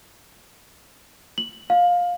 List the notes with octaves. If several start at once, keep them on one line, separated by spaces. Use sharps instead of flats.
F#7
F5